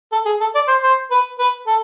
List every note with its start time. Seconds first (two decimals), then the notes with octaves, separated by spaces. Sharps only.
0.12 A4
0.25 G#4
0.41 A4
0.55 D5
0.68 C5
0.83 C5
1.11 B4
1.39 B4
1.67 A4